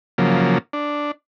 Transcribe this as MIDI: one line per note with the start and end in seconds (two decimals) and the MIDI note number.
0.18 0.58 49
0.18 0.58 53
0.18 0.58 54
0.18 0.58 58
0.73 1.11 62